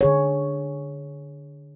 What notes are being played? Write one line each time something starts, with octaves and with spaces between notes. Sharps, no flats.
D3 G#4 C#5